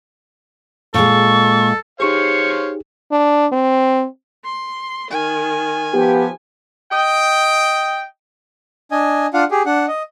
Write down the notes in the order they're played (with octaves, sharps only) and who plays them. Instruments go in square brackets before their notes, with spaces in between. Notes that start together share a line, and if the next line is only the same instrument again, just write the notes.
[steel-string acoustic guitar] A#2 G#3 [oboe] A4 [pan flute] C#6
[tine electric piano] D#4 G4 G#4 [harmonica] C5 C#5 F5 [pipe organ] C#6
[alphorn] D4
C4
[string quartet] C6
[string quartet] D#3 [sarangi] G#5
[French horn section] F3 B3 G4
[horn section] D#5 G5
[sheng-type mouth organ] D4 D#5 G#5
D4 F4 F5 F#5
G4 G#4
D4 F#5
D#5